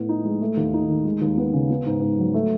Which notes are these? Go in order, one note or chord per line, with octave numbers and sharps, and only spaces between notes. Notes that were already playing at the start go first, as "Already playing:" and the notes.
Already playing: A2 B3
D#4
G#3
A3
D#2
D#4
D#3
G#3
D#2
B3
C#3
B3
G#2
G#2
F#3
A3